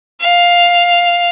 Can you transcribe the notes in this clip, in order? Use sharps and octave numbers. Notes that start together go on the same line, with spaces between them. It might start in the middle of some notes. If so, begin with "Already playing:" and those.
F5